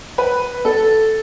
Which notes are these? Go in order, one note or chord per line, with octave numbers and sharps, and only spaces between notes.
B4
A4